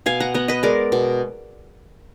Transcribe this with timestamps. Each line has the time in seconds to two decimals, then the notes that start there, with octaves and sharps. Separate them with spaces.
0.06 B2 F5 G#5
0.20 F#5 A#5
0.34 B3 F#5 A#5
0.48 B4 D#5
0.63 G#3 A#4 D5
0.92 B2